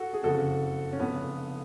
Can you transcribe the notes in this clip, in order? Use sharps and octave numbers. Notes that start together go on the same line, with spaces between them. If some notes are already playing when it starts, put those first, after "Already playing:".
Already playing: F#4 A4
G#4
F#1 F2 C#3 F#4 A4
C#4
F1 F2 C#3 B3